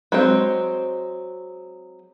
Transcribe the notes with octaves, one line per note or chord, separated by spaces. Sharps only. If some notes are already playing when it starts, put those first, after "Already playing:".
F#3 G#3 C4